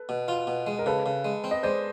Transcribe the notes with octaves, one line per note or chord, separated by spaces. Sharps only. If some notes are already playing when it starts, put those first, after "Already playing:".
Already playing: A4 B4
B2
F4
B2
G#3
A#4
C#3 A4 B4
C#3
G#3
C4
D#5
G#3 C5 D5